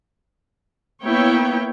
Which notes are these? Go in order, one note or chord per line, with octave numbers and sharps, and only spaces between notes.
A#3 B3 E4 C#5 G5